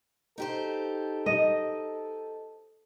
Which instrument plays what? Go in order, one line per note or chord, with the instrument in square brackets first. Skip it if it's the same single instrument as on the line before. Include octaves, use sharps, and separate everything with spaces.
[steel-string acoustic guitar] D#4 G4 C5 [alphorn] A4
[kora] D#5